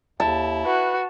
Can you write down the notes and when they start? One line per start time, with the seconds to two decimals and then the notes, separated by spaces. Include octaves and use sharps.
0.20 D#2 E4 A5
0.65 F#4 B4